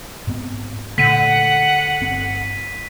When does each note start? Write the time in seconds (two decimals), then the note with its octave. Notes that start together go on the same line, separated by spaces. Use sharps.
0.27 G#2 B3 C4
0.98 A#2 D3 A3 F#5 B6 D#7
2.02 G1 C4